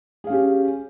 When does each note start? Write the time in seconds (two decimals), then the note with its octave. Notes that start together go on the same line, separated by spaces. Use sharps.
0.24 G#4
0.27 F5
0.30 C#4
0.32 G4